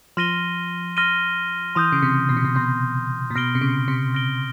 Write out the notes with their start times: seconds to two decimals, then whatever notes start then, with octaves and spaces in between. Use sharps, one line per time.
0.17 F3 C6 F6 A#6 D#7 G7
0.97 C6 F6 A#6 D#7 G7
1.75 E3 C6 D#6 G6
1.92 C#3
2.02 C3
2.29 B2
2.37 C3
2.45 B2
2.55 B2 C6 D#6 G6
3.30 A#2
3.35 B2 F6 A#6 D7 G7
3.55 C3
3.61 C#3
3.88 C3
4.14 F6 A#6 D7 G7